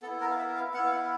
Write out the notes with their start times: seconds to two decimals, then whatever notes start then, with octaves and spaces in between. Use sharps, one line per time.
0.02 B3 E4 A4
0.20 A#4
0.31 F5
0.38 E5
0.56 F5
0.74 B3 E4 F#5
0.86 F5
0.91 F#5